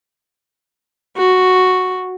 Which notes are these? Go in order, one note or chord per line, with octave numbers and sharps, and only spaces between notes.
F#4